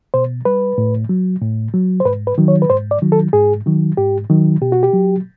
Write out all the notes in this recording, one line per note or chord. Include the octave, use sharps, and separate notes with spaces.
B2 C5
G3 B4
A2
F#3
A2
F#3
C5
G#2 B4
B4
D#3 F#3
C#5
B4
G#2 C5
D5
D#3 F#3
A4
G#2 G#4
D#3 F#3
G#2 G4
D#3 F#3
B2 G4
F#4
G4
F#3